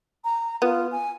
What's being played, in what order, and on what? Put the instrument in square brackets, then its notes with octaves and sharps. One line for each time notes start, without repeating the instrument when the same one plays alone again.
[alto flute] A#5
[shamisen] B3 [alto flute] F4
[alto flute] G#5